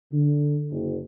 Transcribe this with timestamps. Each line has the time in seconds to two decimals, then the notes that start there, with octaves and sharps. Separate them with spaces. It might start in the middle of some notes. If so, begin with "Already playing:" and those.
0.12 D3
0.71 F#1